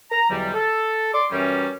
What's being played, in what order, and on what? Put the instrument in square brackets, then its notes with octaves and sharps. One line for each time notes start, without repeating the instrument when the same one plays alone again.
[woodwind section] A#5
E2 B2 D3 F#3 G3
A4
D5 C6 D6
F#2 E3 G3 C#4